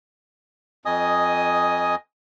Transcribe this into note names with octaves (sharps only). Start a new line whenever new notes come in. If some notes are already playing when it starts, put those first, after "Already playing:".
F2 D#5 G#5 D#6